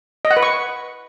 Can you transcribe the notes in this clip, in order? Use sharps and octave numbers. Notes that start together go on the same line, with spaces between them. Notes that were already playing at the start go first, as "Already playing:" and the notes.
D#5
F#5
B4
C#6